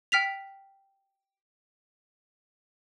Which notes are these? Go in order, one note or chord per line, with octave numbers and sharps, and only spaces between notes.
G5 F6 B6 F7